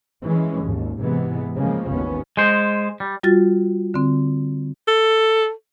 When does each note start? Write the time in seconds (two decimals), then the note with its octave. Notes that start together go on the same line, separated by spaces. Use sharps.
0.23 E3 G#3 C#4
0.63 G#1 D#2
0.99 G#2 C3 E3 G#3 B3
1.56 C#3 F3 G#3 A#3
1.90 G#1 D#2 B3 C#4
2.37 G#3 C5
3.00 G3
3.23 G3 F4 F#4 A6
3.94 D3 C4
4.88 A4